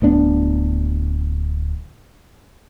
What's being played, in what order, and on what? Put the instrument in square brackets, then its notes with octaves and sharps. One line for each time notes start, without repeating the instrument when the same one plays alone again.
[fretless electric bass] D1 B3 D4